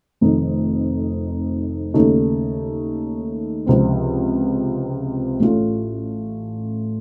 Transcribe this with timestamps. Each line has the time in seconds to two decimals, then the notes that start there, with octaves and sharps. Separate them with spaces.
0.21 F1 F2 D#3 A3 D#4
1.94 D#2 C#3 A3 D#4
3.66 C#2 C3 F3 C4
5.40 A1 A2 A3 C#4 F4